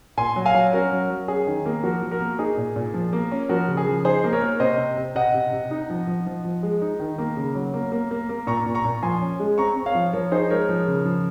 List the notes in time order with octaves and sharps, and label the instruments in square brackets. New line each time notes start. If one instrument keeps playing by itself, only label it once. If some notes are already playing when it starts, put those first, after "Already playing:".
[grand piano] A#2 G#5 C6
F#3
F5 G#5
F#3
C#4 F#4 A#4
F#3
F#3
C#4 G#4
D#3
A#3
F3 F#4 A#4
F3
F#4 A#4
A#3
D#4 G#4
A#2
A#2
F3
A#3
C#4
F3 F#4 A#4
C#3
G#4
F3
D#4 G#4 C5
A#3
A#4 C#5
A#3
C3 C5 D#5
C3
C3
C3 D#5 F#5
C3
C3
D#4
F3
F3
F3
F3
G#3
D#4
D#3
A#3
C#3
F#3
A#3
A#3
A#3
A#3
A#2 A#5 C#6
A#2
A#5 C#6
A#2
F3 G#5 C6
C#4
G#3
C4 A#5 C#6
C4
C#5 F5
F3
F3 A#4 C#5
D#4 G#4 C5
G#3 A#4 C#5
F3
C#3
F3